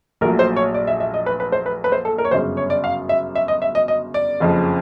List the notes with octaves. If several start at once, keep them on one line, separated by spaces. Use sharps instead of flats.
A#1 A#2 F#3 A3 A#4
C5
C#5
D5
E5
E5
D#5
B4
B4
C5
B4
B4
C5
A4
A#4
C#5
G1 F#2 C#3 C5
C#5
D5
F5
E5
E5
D#5
E5
D#5
D#5
D5
F#1 F2 C#3 F3